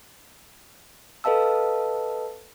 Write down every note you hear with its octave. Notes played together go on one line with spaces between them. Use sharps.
A4 B4 D#5 F5 A5 E6